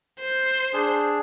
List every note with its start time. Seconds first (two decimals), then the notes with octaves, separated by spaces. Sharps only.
0.20 C5
0.73 D4 G#4